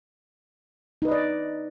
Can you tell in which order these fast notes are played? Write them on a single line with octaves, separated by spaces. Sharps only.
D#4 B4 D#5 D5